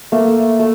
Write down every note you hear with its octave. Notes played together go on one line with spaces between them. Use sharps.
A3 A#3
A3